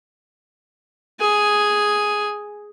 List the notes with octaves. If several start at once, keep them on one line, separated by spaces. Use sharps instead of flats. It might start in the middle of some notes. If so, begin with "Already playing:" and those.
G#4 G#5